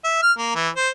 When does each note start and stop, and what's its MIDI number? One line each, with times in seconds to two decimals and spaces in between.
0.04 0.21 76
0.22 0.32 89
0.38 0.53 58
0.55 0.69 52
0.76 0.89 72